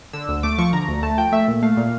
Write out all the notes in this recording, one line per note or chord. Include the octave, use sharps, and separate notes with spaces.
D3 E6
D2
A3 D6
F3 C#6
D3 A#5
D2
A3 A5
F3 G5
A3 E5
A#2
A3 F5
A#2